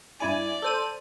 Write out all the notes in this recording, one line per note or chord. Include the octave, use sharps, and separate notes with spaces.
G2 E4 D5 G#5
A4 C5 D#7